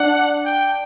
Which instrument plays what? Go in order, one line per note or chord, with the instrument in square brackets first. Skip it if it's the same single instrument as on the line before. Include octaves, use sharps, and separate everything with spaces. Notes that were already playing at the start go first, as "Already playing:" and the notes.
Already playing: [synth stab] D4 [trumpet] F#5
[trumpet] G5